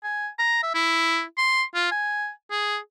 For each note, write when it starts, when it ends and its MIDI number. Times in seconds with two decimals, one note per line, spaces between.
0.04 0.28 80
0.39 0.60 82
0.63 0.70 76
0.75 1.22 64
1.38 1.62 84
1.75 1.88 65
1.91 2.30 80
2.51 2.78 68